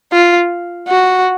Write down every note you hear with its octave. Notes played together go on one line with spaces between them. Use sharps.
F4
F#4